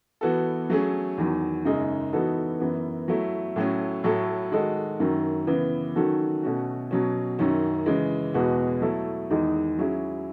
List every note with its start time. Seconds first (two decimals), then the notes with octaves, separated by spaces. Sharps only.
0.21 E3 B3 F#4 A4
0.70 F#3 A3 C#4 G#4
1.18 E2 D#3 F#3
1.65 F#2 C#3 G#3 D#4 G#4
2.13 E3 B3 D#4 F#4 A4
2.60 F#2 E3 B3
3.08 F#3 A3 E4
3.56 A2 F#3 A3 C#4
4.04 A2 F#3 A3 E4 A4
4.51 D#3 G#3 D#4 F#4 A4
5.00 F#2 D#3 F#3
5.47 C#3 E3 B3
5.96 D#3 F#3 C#4 F#4 A4
6.43 B2 A3 C#4 F#4
6.91 B2 F#3 C#4
7.39 F#2 D#3 F#3 C#4
7.86 C#3 E3 G#3
8.34 E2 B2 G#3 B3 F#4
8.82 F#3 A3 E4 A4
9.30 E2 D#3 G#3 D#4
9.78 F#3 C#4 E4 G#4